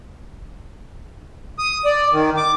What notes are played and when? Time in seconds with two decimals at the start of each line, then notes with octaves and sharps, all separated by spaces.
1.59 D#6
1.85 D5
2.12 D#3
2.37 D6